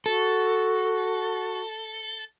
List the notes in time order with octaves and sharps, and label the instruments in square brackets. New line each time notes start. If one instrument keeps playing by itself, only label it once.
[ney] F#4 [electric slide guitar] A4